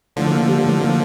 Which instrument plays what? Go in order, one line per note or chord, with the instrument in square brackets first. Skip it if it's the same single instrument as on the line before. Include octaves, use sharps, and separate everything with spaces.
[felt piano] A2 [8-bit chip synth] D3 F3
[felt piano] A#3
G3
A2
A#3